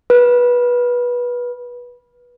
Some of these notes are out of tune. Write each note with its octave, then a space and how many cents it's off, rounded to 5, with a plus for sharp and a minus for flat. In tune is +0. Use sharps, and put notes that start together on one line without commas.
B4 -20